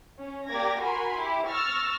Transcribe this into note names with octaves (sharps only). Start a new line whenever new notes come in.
C#4
A#3 G4 D5 G#6 A#6
F#4 A#4 G#5 B5 C6
E4 G4
C#6 E6 F6 A6 A#6